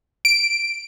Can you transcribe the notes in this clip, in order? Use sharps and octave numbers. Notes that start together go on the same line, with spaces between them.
D7